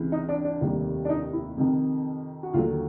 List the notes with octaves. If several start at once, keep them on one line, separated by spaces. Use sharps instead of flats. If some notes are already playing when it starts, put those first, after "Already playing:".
Already playing: C#2 C3 E3
D#4
D4
D4
F1 D#2 D#3 G3
D4
D#4
E4
F2 C3 D#3
F#4
D#2 D3 F#3 F4